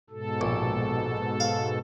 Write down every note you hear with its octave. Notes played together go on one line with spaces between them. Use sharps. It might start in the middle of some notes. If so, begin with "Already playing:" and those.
G#2 B2 A4
A#1
F5